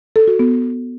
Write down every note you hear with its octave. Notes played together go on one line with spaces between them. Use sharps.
A4
F#4
B3